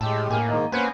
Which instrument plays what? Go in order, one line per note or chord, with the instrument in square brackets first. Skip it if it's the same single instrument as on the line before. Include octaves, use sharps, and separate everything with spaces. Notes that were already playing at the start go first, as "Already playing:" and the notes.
[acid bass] A2 [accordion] G#3 G4 [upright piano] A5 [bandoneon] E6
[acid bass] A2 [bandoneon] A#3 [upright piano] G#5 F6
[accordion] G#2 D#3 [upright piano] D#5 A#5
[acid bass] A#3 [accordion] B3 C#4 [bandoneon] B4 C5 [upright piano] B5 G#6 C#7